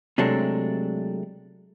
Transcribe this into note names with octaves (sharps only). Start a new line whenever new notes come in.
C3 F#3 G#3 A3 D4 A4